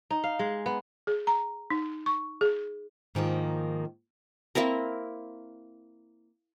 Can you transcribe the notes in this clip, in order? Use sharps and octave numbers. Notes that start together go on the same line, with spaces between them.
D#4
F5
G#3
B3
G#4
A#5
D#4
C#6
G#4
G#2 D#3 F3 A#3
A#3 C4 E4 A#4